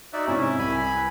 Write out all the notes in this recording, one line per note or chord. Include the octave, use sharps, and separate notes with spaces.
D#4 F#4 D5 E5
G#2 C3 C#4 E4 A#5
C2 G#5 B5
B4